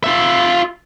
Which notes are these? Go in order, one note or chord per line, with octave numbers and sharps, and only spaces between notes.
F4 E5